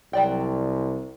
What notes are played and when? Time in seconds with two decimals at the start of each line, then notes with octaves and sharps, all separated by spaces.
0.13 C2 F#3 D5 G5